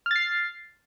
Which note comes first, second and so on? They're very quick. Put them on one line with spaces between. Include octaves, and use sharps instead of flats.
F6 A6 C7